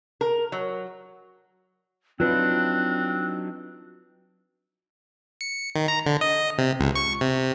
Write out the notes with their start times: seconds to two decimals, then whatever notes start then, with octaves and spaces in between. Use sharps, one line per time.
0.21 A#4
0.52 F#3
2.20 F#3 C4 D4 D#4 F4 B4 F#6
5.41 C#7
5.75 D#3
5.88 A#5
6.06 D3
6.21 D#5
6.58 C3
6.80 C#2
6.96 C#6
7.21 C3